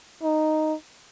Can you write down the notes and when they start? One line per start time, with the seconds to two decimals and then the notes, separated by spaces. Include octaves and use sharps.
0.23 D#4